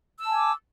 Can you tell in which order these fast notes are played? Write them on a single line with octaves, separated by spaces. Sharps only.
E6 A5 G#5 D6